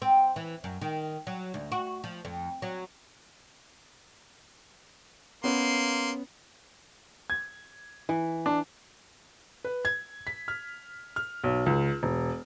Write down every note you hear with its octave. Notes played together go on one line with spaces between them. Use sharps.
C4
E3
F#2
D#3
F#3
D2
F#4
F3
F2
F#3
A#3 B3 C#4 C6
G#6
E3
D4
B4
G#6
B6
F6
F6
B1
C#2
E1